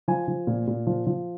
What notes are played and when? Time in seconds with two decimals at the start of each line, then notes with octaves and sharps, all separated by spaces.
0.08 F3 G#5
0.28 F3
0.47 A#2
0.67 A#2
0.87 F3
1.07 F3